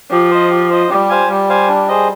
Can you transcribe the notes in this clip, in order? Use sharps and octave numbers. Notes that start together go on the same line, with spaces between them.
F3 G4
C5 D#5
G4
C5 D#5
G3 G4
C5 F5 G#5
G3 G4
C5 F5 G#5
D4
G#4 C5 D#5